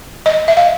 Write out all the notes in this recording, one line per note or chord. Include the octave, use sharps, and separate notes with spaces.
D#5
E5
F5